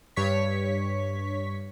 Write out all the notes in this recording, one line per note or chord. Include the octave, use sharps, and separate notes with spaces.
G2 C#5 C#6 B6